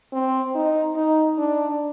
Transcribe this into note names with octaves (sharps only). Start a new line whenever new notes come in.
C4
D#4
D#4
D4